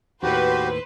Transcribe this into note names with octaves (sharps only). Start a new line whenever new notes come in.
D#2 A2 F#4 G4 B4 C5